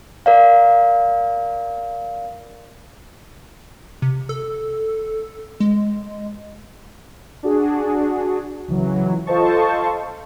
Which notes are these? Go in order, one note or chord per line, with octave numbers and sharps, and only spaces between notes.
A#4 D5 F5
C3
A4
G#3
D4 F#4 G#4
C#2 E3 F#3
F4 A4 C5 D#5 A5 C#6